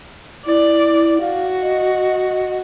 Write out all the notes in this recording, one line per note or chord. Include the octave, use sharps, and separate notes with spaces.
E4 D5
F#4 F5
D#5